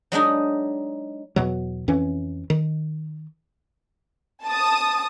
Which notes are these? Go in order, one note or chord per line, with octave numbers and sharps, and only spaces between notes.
F#3 G#3 D4 D#4
E2 B2 F#3
F2 E3 C#4
D#3
A5 D#6